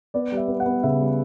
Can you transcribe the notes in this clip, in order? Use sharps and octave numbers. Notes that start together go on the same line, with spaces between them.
B3 D5
G3
E5
B3
F#5
B3
C#3 E5
G3